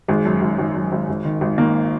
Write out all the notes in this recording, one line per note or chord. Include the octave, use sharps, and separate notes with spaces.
G#1 G#3
F#2
G#1
G#1
F#2
G#1
G#1
D#3
G#1
D#3 A#3